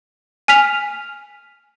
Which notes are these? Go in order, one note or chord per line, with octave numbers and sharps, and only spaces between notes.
G#5 F6 B6 F7